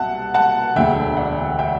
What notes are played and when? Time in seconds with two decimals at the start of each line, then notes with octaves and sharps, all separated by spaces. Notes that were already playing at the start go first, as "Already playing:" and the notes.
Already playing: C2 B2 E5 F#5 A5
0.34 F#5 A5
0.76 E1 D2 D3 E5 G5
1.17 D5 F#5
1.59 E5 G5